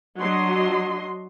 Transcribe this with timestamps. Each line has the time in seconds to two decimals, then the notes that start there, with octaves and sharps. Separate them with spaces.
0.20 F#3 D4 D#5 C6